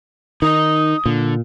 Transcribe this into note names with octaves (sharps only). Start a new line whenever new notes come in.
D#3 D#4 D#5 D#6
A#2 D3